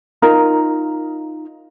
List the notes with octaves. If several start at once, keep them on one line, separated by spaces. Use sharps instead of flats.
D#4 F4 A#4